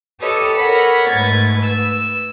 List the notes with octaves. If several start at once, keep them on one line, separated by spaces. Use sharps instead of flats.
G4 A4 B4 C#5 D#5
A#4 C#5 F#5 B5
G#2 A3 B4 G#6 A6
E6